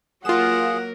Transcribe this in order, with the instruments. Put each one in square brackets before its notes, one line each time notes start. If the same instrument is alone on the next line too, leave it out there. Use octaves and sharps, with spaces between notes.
[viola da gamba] F#3 A#3 A#4 [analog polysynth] F4 E7 [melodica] G#4 [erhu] F#5